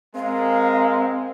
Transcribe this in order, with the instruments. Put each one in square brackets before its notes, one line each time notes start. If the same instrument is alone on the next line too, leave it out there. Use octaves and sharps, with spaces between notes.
[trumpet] G#3 [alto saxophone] C4 [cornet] A#4 [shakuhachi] F5